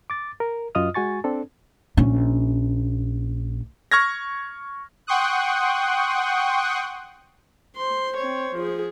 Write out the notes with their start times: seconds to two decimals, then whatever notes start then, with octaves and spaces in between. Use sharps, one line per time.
0.10 D6 A6
0.40 A#4
0.75 F#2 F4 D#5 D#6 F6
0.95 G#3 F#4 G#5 C#6 A6
1.24 C4 D4 A4
1.97 A#1 C#4
3.92 C#6 F6 G#6 A#6
5.07 F#5 G5 C6 C#6 D#6 F#6
7.77 C5 C6
8.17 C4 C#5
8.55 F3 G#4